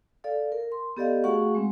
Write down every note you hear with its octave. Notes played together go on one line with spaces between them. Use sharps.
A4 D5 F5
A#4
C6
B3 G4 A4 D5 D#5 F5
A3 F#4 G#4 F5 F#5 C#6
G#3 C4